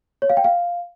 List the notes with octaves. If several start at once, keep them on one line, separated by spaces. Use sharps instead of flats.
C#5
F5
G5
F5